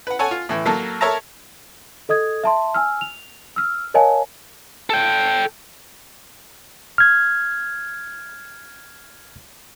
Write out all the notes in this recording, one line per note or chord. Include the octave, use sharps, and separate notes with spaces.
B4 F#5
A4 C#5 F#5 G#5
F4
A2 E3
F#3 A#3 A4
A4 A#4 C#5 E5 A5 A#5
A4 D#5 D#6 G#6
E5 A5 C6
G#5 E6 F6
F7
E6 F6
A#4 C#5 D#5 F5 G#5 A5
A4 G5
F6 G#6